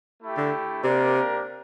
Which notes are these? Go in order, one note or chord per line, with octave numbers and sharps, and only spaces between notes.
A3 E4 G4
D3
C3 A#3 D4 G4 A#4 D5